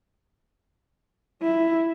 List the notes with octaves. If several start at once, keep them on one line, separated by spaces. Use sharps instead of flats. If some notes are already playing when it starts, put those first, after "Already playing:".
E4